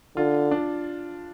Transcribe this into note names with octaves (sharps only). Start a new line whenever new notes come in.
D3 F4
D4